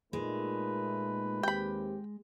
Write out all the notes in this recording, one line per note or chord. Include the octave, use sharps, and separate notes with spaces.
A#2 G#3 A3 D#4 B4
D#2 C4 G4 G5 B5